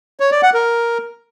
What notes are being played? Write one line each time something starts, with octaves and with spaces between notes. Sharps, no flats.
C#5
D5
F#5
A#4